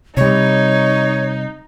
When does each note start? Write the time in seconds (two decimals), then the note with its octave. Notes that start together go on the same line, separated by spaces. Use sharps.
0.17 C3 G3 D#4 C#5